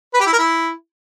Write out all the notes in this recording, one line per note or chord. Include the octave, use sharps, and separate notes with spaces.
B4
G4
E4
A#4
E4